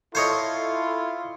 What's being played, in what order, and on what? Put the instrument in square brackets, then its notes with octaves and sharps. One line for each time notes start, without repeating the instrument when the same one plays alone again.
[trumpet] E4 [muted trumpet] F4 [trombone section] A4 [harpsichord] C5 C#5 D#5